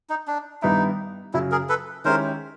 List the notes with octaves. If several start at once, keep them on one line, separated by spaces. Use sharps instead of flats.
D#4
D4
G2 D#3 G3 B3 D#4 E4
F#2 C#3 F#3 E4
G#4 A#4
A4 B4
D#3 G#3 C#4 E4 G4 A#4 C5